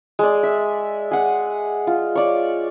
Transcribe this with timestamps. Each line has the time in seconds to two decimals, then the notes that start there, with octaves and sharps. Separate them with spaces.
0.19 G#3 D5
0.43 E5
1.11 G#4 F#5
1.87 F4
2.15 C#5 D5